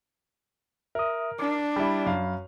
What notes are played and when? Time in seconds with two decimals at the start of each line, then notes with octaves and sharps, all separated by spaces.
0.95 A#4 E5 D#6
1.39 D4 D6
1.76 G3 E4 B5
2.06 F#2 F5